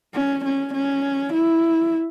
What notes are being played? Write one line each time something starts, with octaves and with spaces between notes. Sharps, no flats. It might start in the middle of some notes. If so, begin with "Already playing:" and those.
C#4
C#4
C#4
E4